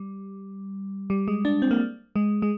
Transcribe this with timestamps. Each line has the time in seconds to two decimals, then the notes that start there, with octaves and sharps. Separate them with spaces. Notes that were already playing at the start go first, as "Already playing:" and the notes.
Already playing: G3
1.10 G3
1.28 G#3
1.45 D4
1.62 C4
1.71 A#3
2.16 G#3
2.42 G#3